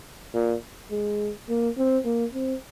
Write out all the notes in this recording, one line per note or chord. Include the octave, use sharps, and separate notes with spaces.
A#2
G#3
A#3
C4
A#3
C4